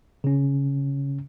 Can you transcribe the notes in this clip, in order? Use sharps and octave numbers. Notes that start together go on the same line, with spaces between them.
C#3 C#4